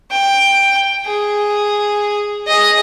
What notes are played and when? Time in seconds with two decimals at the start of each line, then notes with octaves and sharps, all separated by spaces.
0.11 G5
1.06 G#4
2.47 G#4 D#5